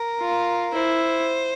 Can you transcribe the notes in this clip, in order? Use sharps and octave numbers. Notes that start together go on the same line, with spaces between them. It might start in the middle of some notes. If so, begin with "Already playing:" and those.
Already playing: A#4
F4
E4 C5